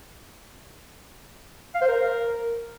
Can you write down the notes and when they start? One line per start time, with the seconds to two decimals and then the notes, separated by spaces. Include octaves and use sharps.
1.75 F5
1.81 C5
1.88 A#4